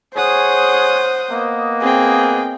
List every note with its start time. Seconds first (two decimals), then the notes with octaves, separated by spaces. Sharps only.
0.16 G#4 C5 C#5 F#5 D#6
1.30 A#3 B3 D#5
1.82 C4 G#4 G5